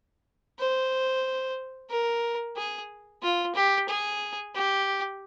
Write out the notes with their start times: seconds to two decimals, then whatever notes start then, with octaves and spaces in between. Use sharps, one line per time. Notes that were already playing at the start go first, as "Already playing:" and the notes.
0.59 C5
1.90 A#4
2.57 G#4
3.22 F4
3.55 G4
3.88 G#4
4.55 G4